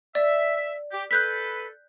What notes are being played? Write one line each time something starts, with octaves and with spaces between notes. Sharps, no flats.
D5 E5
G4
A4 B4 F#6 G6 B6